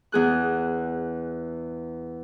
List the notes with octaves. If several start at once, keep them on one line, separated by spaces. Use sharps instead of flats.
E2 G#4 F#6